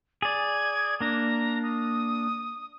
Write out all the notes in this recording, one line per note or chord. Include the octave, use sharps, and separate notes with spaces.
G#4 D5 G#6
A#3 D4 A#5
D#6